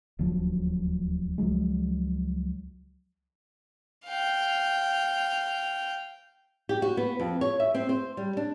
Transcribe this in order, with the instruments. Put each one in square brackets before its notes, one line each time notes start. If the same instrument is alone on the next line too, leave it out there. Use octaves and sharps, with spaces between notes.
[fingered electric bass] D#1 D2 F3 F#3
C#2 F3 F#3 G#3
[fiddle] F5 G5
[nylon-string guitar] G4
F#4
B3
F2
C#5
E5
C4
C5
G3
D4